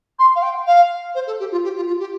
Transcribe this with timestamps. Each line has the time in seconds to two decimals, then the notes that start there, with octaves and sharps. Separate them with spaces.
0.19 C6
0.35 F5
0.42 G5
0.67 F5
1.15 C5
1.27 A4
1.40 G4
1.52 F4
1.64 G4
1.76 F4
1.87 F4
1.99 G4